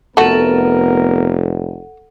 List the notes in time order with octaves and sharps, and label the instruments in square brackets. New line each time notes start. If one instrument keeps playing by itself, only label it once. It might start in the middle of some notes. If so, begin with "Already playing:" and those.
[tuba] F1 [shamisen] A3 F#4 [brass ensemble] B3 A#4 [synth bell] A4 F#5